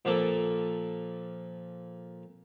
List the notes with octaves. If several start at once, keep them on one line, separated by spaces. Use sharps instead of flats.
A#2 F3 A#3 A4